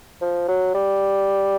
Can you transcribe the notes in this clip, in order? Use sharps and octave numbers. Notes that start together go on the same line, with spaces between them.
F3
F#3
G3